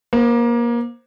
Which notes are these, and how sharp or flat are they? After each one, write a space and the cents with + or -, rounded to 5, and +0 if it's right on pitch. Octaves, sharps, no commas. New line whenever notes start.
A#3 +25 C5 +0